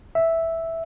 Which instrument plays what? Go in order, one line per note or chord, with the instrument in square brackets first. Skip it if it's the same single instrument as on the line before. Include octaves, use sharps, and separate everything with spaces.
[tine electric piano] E5